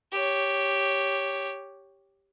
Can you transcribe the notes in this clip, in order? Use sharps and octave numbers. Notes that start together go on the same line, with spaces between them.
G4 C#5